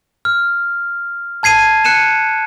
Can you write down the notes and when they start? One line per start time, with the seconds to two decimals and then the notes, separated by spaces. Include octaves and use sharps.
0.25 F6
1.43 A5 G#6 C7 D#7
1.85 F#6 C#7 D#7 E7